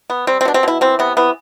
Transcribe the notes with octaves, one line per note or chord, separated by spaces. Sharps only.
B3
G3 C4
C4
B2 D4
C4
B2 E4
E3 C4
C3 B3
E3 B3